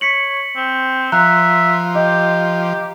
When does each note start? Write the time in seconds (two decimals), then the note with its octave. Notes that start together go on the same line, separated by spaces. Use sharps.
0.01 C#5 B6 C#7 F#7
0.56 C4
1.12 F3 E5 A#5 F#6
1.95 G4 D#5